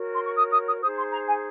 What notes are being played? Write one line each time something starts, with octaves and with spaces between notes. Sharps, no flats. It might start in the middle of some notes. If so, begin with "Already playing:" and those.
Already playing: F#4 A#4 C#5
C6
C#6
D#6
D#6
D#6
D#4 G#4 C5 D#6
C6
A#5
G#5